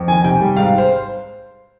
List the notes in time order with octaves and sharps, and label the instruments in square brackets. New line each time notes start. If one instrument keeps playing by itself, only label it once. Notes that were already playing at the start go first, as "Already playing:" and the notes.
Already playing: [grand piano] F2
D#3 G#5
C3 G5
G3
G#2 F5
C5